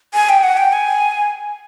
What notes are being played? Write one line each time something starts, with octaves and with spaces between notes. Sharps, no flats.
G#5
G5
F#5
G5
G#5